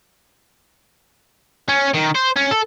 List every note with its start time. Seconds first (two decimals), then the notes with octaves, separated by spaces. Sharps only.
1.69 C#4
1.94 D#3
2.15 C5
2.37 C#4
2.51 A4